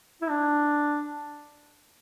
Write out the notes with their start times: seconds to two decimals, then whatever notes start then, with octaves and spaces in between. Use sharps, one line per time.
0.22 E4
0.30 D4